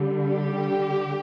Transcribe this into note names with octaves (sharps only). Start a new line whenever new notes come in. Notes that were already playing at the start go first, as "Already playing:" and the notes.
Already playing: D3 G3
G4